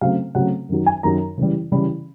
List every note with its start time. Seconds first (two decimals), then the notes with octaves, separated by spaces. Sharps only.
0.01 C#3 F#3 A3 C4 F5
0.35 C#3 F#3 A3 C4 F#5
0.69 F#2 D#3 F#3
0.86 G#5
1.03 F#2 D#3 F#3 A#5
1.38 C#3 E3 G3
1.72 C#3 E3 G3 B5